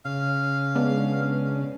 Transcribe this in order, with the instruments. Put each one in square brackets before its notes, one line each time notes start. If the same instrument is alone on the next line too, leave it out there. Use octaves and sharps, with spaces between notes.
[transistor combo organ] C#3 [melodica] F5
[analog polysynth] G#3 B3 D4